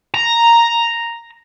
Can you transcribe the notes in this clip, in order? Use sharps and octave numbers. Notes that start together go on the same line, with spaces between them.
A#5